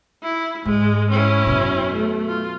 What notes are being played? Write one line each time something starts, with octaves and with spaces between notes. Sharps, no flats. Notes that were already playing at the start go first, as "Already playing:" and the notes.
E4
G#2 G#3
C#4 E4
F#2 B2
A3
F4